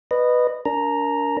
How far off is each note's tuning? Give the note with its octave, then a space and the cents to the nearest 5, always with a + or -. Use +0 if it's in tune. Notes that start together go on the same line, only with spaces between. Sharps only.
B4 +0 D#5 -20
D4 -35 A#4 +0 A#5 +0